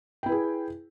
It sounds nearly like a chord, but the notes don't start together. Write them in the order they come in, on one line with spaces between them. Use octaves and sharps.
G5 E4 B4 G#4